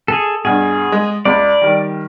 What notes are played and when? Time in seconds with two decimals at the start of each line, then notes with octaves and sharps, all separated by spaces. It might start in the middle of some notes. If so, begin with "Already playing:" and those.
0.08 G#4 A4
0.45 G2 B2 G#4
0.92 G#3
1.25 C#2 D5
1.62 D#3 G3